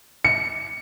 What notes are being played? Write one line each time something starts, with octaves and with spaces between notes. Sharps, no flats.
C#7